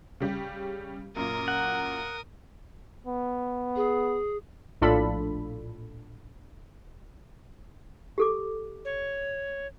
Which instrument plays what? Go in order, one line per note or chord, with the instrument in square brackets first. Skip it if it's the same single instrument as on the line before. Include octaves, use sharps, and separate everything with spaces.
[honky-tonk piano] C#3 G3 G4
[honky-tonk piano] F#2 A#2 [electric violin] A#4 D#6
[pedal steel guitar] F#5
[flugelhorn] B3
[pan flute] G#4
[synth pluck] A#1 A2 D4 F4 A4 B5
[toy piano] G4 A4 D6
[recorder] C#5